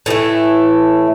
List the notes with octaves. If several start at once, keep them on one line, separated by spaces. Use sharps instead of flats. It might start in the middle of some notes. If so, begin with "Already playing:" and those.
A2 E3 A3